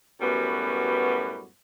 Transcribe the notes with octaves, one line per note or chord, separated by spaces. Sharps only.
F#2 A2 G3 B3 F#4 B4